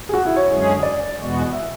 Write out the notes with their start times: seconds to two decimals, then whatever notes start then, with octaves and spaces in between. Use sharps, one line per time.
0.09 G#4
0.14 F#4
0.25 E4
0.36 C#5
0.48 F#2 D3 G#3 C#4 G#4
0.83 D5
1.17 E2 B2 G#3 B3 F#4
1.53 E5